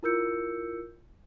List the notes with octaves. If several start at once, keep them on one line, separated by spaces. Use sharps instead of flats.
E4 F4 A#4 E6 G6 C#7